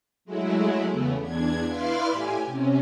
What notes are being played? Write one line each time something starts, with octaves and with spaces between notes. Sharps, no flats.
F#3 G#3 A3 E4
E2 C#3 A3 B3
E2 D4 G#6
E4 B4 D5 F5 C6 F6
A2 G4 G#5
C3 C#4